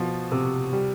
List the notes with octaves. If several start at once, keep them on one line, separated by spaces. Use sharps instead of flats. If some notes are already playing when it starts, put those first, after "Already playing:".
Already playing: B2 F3
C3
G3